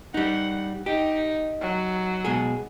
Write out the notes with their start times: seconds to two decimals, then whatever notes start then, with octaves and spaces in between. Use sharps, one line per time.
0.14 G3 D#4 F#5
0.86 D#4 G4
1.61 F#3
2.25 B2 G#3 G#4